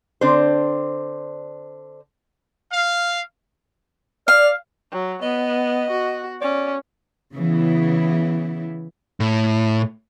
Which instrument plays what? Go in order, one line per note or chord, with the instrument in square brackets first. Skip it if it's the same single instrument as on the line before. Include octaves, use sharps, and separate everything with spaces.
[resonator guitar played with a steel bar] D3 C4 D4 C5
[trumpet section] F5
[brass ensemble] D5 [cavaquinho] F5 [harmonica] F6
[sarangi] F#3
[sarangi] B3 [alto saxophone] D#5
[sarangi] F#4
[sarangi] C#4 [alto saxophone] D5
[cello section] C#3 E3 B3 E4
[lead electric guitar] A2